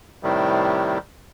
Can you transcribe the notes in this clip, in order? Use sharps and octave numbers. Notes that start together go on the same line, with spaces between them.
A2 C3 D#3 G3